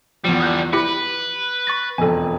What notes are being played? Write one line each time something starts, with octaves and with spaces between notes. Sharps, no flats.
E2 D3 F3 G3
D#6 F#6 G6
E4 G4 B4 C#7
C#6 A6 A#6
E1 F2 A4 G#5